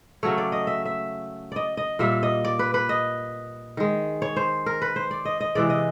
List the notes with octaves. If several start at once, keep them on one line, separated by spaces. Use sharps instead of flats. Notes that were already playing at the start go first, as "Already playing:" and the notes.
C#3 F#3 A3 C#5
D5
D#5
E5
E5
D5 D#5
D#5
A#2 G3 A#3 E5
D#5
D5
B4
B4
D#5
D#3 G#3
C#5
C5
A#4
B4
C5
D5
D#5
D#5
C3 E3 G#3 D5
D#5